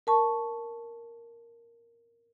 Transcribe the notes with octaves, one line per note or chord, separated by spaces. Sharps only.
A#4 A5 C#6